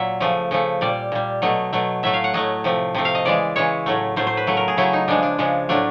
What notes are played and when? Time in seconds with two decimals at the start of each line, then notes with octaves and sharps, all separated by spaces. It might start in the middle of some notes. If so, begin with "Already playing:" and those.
Already playing: A#2 F#3 E5
0.20 C#3 F3 A3
0.51 C#3 F3 A3
0.81 A#2 G3 D5
1.12 A#2 G3
1.42 B2 F#3 A3 D#5
1.73 B2 F#3 A3
2.03 A2 F#3 A3 E5
2.14 F5
2.24 F#5
2.34 A2 F#3 A3 D#5
2.64 C3 F3 A3
2.95 C3 F3 A3
3.05 F5
3.15 D#5
3.25 C#3 E3 G#3 D5
3.56 C#3 E3 G#3 C#5
3.86 A2 F#3 A3
4.16 A2 F#3 A3 C5
4.27 C5
4.37 B4
4.47 C#3 F#3 A3
4.57 A#4
4.68 G#4
4.77 C#3 F#3 A3 E4
4.93 D#4
5.08 C#3 F3 G#3 D4
5.23 D4
5.38 C#3 F3 G#3
5.69 A2 F#3 A3 D4